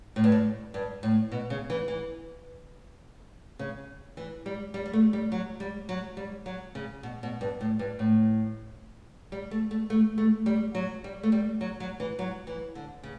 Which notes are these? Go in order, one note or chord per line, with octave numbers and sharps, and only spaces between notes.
A2
G2
A2
G2
A2
B2
C#3
E3
E3
C#3
E3
G3
G3
G3
A3
G3
F#3
G3
F#3
G3
F#3
C#3
B2
B2
G2
A2
G2
A2
G3
A3
A3
A3
A3
G3
F#3
G3
A3
G3
F#3
F#3
E3
F#3
E3
D3
C#3